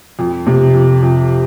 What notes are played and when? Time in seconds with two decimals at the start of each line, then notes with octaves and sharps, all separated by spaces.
0.19 F2
0.47 C3
0.74 F2
1.03 F2